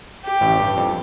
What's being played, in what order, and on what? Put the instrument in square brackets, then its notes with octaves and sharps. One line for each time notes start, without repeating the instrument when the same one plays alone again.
[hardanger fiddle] G4
[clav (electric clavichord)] A1 A2
G2
F2